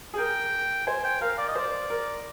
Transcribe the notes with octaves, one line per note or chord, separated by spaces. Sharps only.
G#4
A#4 G5
C5 G#5
G5
A#4 F5
D5
D#5
C5 D5
A#4